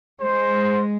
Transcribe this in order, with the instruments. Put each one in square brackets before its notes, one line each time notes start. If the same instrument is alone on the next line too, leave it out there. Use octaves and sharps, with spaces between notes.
[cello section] G#3 [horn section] C5